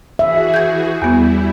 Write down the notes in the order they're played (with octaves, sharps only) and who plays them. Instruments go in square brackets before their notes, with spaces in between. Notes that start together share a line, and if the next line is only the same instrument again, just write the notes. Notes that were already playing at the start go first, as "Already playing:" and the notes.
[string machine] E3 F#4 G#4 [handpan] E5
[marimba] G6 G#6
[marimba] E2 B3 [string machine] G3 E4